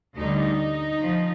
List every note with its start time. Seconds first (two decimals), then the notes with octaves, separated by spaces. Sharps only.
0.18 D2 D3 G3 D#4
1.04 F3